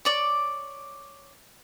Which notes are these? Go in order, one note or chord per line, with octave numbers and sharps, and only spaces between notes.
C#5 D5 D6